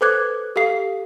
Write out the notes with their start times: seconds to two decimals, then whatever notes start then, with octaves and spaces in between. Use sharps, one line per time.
0.01 A4 B4 C5 D6 F#6 G#6
0.56 G4 A4 F5 C7